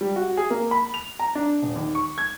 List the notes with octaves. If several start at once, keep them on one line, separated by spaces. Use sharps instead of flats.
G3
F#4
G#4
A#3
B5
F7
A#5
D4
D#1
D#2
C#6
G#6